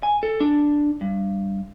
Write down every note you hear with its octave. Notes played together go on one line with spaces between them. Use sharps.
G#5
A4
D4
G2